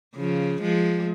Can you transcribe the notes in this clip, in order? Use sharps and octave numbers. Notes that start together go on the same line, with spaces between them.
C#3 F3
F3 G#3